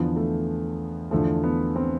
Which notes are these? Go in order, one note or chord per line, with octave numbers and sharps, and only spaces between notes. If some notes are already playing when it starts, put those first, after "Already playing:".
Already playing: E2 D3 F3 B3
A3
E2 D3 F3 A3
B3
C4